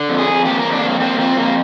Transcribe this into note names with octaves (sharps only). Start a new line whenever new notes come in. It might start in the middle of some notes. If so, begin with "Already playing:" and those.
Already playing: D3
F2
G#4
F2
A#3 G4
F2 A#4
D4
F2 A#3
A#3 C4
F2 C4
F2 A#3